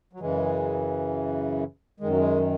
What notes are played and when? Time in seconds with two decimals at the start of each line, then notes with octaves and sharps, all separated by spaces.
0.13 F#3
0.20 F#2 C#3 E3 G#3
2.00 F#2 D#3 G#3
2.09 F#3
2.17 G#3